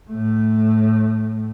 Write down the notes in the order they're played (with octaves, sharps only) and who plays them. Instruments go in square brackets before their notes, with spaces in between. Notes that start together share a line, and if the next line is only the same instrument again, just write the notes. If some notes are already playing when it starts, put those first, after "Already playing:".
[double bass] A2 A3